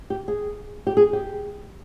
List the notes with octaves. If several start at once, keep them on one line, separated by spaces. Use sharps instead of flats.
G4
G#4
G4
G#4
G4